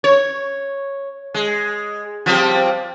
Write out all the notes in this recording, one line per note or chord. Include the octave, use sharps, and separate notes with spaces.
C#5
G#3
F3 G3 C4